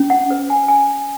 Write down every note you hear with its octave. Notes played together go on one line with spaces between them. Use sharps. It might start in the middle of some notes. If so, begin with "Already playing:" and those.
Already playing: C#4
F#5
B4
G#5
G#5